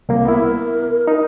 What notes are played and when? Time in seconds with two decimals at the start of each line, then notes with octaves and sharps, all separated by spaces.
0.09 C2 A#3
0.25 B3 E4 A#4
1.07 D#4